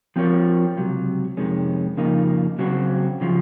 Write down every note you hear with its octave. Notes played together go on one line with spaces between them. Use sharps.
F3 C4 F4 A#4 C#5
C#2 C3 F#3
F2 C3 D#3 G#3 C#4
F2 C#3 F3 A#3 D#4
C#3 F#3 C4 F#4
C#3 F3